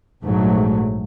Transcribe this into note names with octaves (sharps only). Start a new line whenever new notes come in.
A#1 G#2 F#3 A3